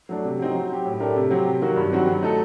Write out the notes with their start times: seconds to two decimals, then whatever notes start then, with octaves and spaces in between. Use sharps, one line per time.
0.09 F#3 A3 D4
0.24 C3
0.39 F#3 C4 D#4
0.55 F#3
0.70 C4 G4
0.85 A2
1.00 A3 D4 G4 A#4
1.16 C3
1.31 F#3 C4 G4
1.46 C3
1.62 D#3 F#3 A#3 F#4
1.76 G2
1.92 D#3 F#3 C4 F#4
2.07 F#3
2.22 A3 D#4 A4